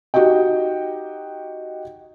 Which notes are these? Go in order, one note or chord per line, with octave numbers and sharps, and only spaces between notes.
D#4 F#4 G4 D#5 G5